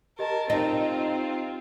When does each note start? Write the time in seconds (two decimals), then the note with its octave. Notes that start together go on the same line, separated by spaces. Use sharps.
0.19 G4 A#4 D#5 A5
0.50 C4 D#4 F4